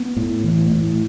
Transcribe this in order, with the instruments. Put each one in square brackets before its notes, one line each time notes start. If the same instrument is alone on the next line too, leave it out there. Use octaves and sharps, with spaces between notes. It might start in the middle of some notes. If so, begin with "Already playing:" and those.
Already playing: [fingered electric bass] B3
A2
E3
A2